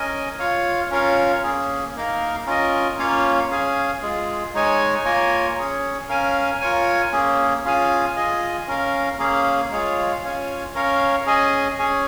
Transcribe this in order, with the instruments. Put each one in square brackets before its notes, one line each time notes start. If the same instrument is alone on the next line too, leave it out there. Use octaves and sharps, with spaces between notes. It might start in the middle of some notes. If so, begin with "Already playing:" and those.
Already playing: [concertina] C#4 A#4 D#5 G#5
F4 C#5 F5
C#4 F4 A#4 C#5 F5
A#3 C#4 G#4
A#3 D#4 A#4 F5
C#4 F4 A#4 D#5
A#3 C#4 F4 C#5 F5
C#4 G#4 F5 G#5
G#3 F4 G#4
G#3 D#4 C#5 G#5
A#3 F4 A#4 C#5 G#5
C#4 G#4 C#5
C#4 A#4 F5 G#5
F4 A#4 C#5 G#5
A#3 C#4 G#4
C#4 F4 G#4 F5 G#5
F4 G#4 D#5 G#5
C#4 A#4 F5
A#3 C#4 G#4 F5
G#3 F4 G#4 C#5 F5
C#4 F4 C#5 F5 G#5
C#4 A#4 C#5 F5
C#4 G#4 D#5 G#5
C#4 G#4 C#5 G#5